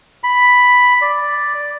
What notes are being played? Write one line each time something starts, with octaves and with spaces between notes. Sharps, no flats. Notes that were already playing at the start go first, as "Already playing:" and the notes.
B5
D5